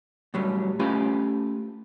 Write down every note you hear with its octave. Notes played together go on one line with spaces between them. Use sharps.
A2 F#3 G3
A3 C#4 F4 G4 B4